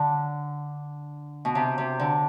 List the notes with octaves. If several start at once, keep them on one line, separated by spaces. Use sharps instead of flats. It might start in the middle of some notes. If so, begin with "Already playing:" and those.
Already playing: D3
B2
C3
C3
D3